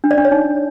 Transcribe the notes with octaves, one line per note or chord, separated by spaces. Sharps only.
D4
D5
D4
C#5
D#4